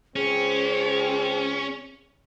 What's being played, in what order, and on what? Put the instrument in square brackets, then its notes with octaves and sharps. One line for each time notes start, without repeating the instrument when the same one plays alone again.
[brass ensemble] C#2 C#3 C4 [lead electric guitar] C#4 [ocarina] G#4